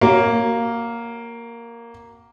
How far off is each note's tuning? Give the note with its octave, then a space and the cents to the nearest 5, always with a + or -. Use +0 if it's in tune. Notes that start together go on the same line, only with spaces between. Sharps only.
A#3 +0 F#4 +30 C#5 +0